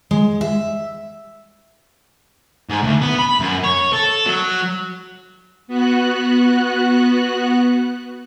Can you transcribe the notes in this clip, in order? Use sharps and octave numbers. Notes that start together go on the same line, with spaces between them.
G#3
E5
G#2
D2
B3
B5
F#2
C#5
A4
F#3
B3 F#4 F#6